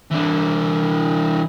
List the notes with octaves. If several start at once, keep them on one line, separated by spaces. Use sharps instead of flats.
E3 D4